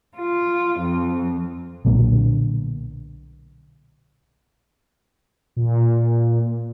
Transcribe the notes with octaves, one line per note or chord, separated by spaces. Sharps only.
F4
F2
B1 A#2 D3 A#3
A#2